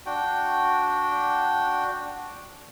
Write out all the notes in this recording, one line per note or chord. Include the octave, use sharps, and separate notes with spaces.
D4 F#4 G5